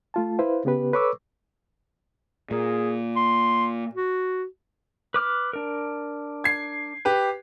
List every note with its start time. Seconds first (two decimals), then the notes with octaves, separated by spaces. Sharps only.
0.14 A3 F4 A5
0.39 E4 B4 C5 F5
0.65 C#3 B3 G4 B4
0.93 A4 B4 C#5 C#6 D6 E6
2.51 A#2 G#4
3.16 C6
3.95 F#4
5.14 B4 D6 F6
5.53 D4 A#4
6.44 G#6 C7
7.05 G4 B4